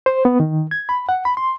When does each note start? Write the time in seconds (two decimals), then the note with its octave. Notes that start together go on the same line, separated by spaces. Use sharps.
0.06 C5
0.25 B3
0.40 D#3
0.71 G#6
0.89 B5
1.09 F#5
1.25 B5
1.37 C6